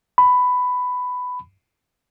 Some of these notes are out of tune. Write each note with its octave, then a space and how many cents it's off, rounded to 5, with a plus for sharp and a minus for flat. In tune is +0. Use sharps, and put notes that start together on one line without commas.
B5 +10